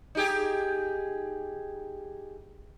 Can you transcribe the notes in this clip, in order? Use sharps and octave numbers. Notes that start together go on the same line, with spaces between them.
D#4 G4 G#4